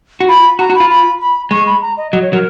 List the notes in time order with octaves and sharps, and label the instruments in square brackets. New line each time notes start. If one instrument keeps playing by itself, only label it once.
[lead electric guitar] F#4
[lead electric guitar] F4 [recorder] B5
[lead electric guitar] F#4 [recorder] A#5
[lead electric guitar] F#4
[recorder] B5
[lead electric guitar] F4
[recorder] B5
B5
[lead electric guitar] G#3 [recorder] C#6
[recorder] B5
A#5
D#5
[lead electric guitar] F#3 [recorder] D#5
[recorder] C#5
[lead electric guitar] F#3 [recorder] A#4